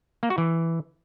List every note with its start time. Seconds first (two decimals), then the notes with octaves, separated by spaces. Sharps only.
0.23 A#3
0.30 F#4
0.38 E3